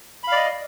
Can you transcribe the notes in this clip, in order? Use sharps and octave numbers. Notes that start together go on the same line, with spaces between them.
D5 D#5 F5 B5